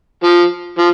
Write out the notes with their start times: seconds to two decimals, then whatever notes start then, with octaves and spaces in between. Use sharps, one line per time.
0.24 F3
0.78 F3